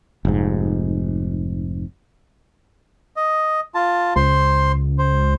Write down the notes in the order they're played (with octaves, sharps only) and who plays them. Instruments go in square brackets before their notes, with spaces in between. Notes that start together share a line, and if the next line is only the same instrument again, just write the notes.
[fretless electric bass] F1 G#2
[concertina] D#5
F4 A5
[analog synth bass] C#2 [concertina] C5 C6
[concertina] C5